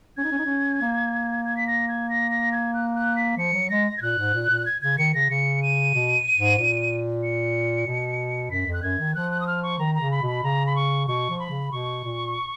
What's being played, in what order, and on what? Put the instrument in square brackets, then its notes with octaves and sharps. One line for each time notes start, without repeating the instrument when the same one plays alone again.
[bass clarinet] C#4 [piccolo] G#6
[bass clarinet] D#4
C#4
D#4
C#4
A#3
[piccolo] G#6
B6
A#6
G#6
A#6
A#6
G#6
F#6
F#6
B6
[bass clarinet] F3 [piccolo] C#7
[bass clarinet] F#3
[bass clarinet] G#3 [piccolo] A#6
[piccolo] G#6
[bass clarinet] A#2 [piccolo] F#6
[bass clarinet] G#2
A#2
A#2
[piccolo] G#6
[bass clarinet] C#3 [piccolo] G#6
[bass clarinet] D#3 [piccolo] C#7
[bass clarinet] C#3 [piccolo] A#6
[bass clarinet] C#3 [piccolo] C#7
[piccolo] D#7
[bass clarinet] B2
G#2
A#2
[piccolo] C#7
[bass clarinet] B2
[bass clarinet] F#2 [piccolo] B6
[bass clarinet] F2
[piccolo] F#6
[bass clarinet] F#2 [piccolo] G#6
[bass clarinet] D#3
[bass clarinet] F3 [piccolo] F#6
[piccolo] F#6
D#6
F6
C#6
[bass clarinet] D#3 [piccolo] A#5
[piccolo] A#5
[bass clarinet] C#3
[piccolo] B5
[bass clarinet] B2 [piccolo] B5
[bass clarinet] C#3 [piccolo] A#5
[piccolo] B5
C#6
[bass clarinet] B2 [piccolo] C#6
[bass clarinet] F3
[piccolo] B5
[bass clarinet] C#3
[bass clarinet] B2 [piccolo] C#6
[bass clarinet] A#2